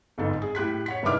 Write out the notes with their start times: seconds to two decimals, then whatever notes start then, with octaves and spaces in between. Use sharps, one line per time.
0.18 G1 F2 G#2 A4
0.42 G#4
0.55 A2 G4 F#6 B6
0.86 C#5 F#5 B6
1.03 F1 G2 D#3 E4 D6 F6